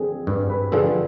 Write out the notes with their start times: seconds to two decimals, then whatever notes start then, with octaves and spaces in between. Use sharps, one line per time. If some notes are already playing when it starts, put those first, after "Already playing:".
Already playing: D3 F3 C4 G#4
0.27 G2 B4
0.50 B4
0.72 D3 F3 C4 G#4